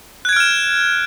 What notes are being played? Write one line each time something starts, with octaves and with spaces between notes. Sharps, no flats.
F6 F#6 G#6 D7 E7